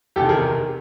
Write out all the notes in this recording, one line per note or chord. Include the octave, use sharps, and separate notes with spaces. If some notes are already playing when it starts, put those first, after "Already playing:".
E2 C3 D#3 G4 A4
G#4 A#4